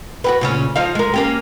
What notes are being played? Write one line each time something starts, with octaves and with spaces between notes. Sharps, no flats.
F#4 G4 B4
A#2 C#3 C#4
F3 D#4 F5
G#3 A#4
A#3 C#4 G4